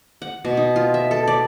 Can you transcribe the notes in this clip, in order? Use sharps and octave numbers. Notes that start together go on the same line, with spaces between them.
F#5
B2
D#4
F4
E5
A4
D5